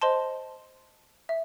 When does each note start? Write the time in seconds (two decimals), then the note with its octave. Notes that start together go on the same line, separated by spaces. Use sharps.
0.02 C5 D#5 A5 C6
1.29 E5